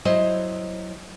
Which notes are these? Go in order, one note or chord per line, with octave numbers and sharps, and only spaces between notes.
F#3 E4 C5 D#5